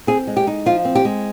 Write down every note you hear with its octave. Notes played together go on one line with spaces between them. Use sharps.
C4 G#4
G#3
G4
D#4
F3 F4
C4
G4
G#3